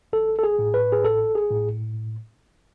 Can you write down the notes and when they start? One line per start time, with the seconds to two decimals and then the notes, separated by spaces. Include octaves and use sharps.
0.13 A1 A4
0.39 A4
0.43 G#4
0.59 A2
0.74 B4
0.92 G#4
1.05 A1 A4
1.35 G#4
1.51 A2